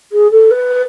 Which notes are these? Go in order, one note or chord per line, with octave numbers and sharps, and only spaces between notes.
G#4
A4
B4